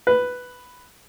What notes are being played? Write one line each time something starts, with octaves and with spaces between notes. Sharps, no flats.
B4